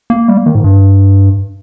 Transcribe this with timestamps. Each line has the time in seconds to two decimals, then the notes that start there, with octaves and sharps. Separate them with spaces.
0.10 A#3
0.28 G3
0.37 A#3
0.46 D#3
0.55 G#2
0.64 G2